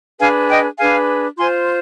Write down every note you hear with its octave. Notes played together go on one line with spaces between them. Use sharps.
D4 G#4 B4 F5 G#5
D#5 G5
D4 G#4 B4 F5 G#5
F4 C5 G#5 C6